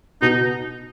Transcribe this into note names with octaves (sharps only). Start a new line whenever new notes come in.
B2 D#4